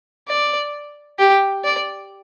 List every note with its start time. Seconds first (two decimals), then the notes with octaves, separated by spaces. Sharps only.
0.28 D5
1.19 G4
1.64 D5